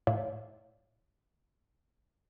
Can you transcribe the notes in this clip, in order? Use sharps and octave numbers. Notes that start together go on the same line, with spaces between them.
A2 C#5 D5 E5 F5